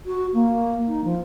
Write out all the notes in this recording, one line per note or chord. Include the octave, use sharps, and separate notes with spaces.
F#4
A#3
D#4
F3